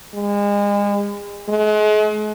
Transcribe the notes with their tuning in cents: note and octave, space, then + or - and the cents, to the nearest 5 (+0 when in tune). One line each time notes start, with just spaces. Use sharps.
G#3 -35
G#3 +40